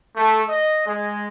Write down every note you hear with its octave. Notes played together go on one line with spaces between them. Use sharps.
A3
D#5
G#3